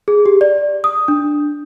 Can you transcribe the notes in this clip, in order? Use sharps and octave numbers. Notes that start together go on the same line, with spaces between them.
G#4
G4
D5
D#6
D4